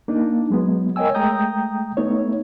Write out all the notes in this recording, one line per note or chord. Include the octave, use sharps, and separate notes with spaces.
A#3 D4 D#4
F#3 G#3 B3
A#4 C#5 D#5 G5 G#5 E6
G#3 A3 G5 A#5 D#6 G6
A3 B3 D#4 C#5